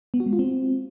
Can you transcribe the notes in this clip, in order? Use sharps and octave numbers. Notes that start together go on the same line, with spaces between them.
B3
F#4
G#3
F4
C4